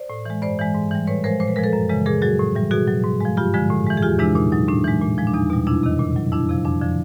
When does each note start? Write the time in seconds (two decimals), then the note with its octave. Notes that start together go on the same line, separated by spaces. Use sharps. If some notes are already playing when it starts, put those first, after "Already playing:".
Already playing: C5 D5
0.10 A2
0.25 E3 G#3
0.42 G2 C5 D5
0.59 E3 G#3
0.75 G#2
0.91 E3 G3
1.07 A2 B4 C#5
1.24 F3 G#3 A#4 C5
1.40 A#2 C5
1.48 B4
1.56 F3 G#3 A#4
1.64 A4 B4
1.73 F#2
1.89 C#3 E3 G#3
2.06 A#2 G#4 A#4
2.22 F#3 F#4 G#4
2.39 A2
2.55 E3 G3
2.71 B2 F#4 G#4
2.88 F#3
3.04 G#2
3.21 F3 G#3
3.37 G2 F4 G4
3.54 D3 F3 G#3
3.70 A2
3.86 E3 G#3
3.97 G#4
4.03 E2 F4 G4
4.19 C3 E3 G#3 D4 E4
4.36 A#2 D#4
4.52 F#3 D#4
4.68 A2 D4
4.84 E3 G#3
5.01 A#2
5.18 F3 G#3
5.27 D4
5.34 E2 D#4
5.50 B2 G3
5.67 F2 D4 E4
5.83 C3 D#3
5.99 A#2
6.16 F#3
6.32 F2 D4 E4
6.49 C3 F3
6.65 F2 D4
6.81 D3 F3